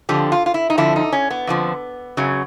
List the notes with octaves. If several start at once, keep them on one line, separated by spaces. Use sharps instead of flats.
F2 D3 F3 G4
F4
F4
E4
D#4
F2 D3 F3 E4
D#4
C#4
B3
F2 D3 F3
F#2 C#3 F#3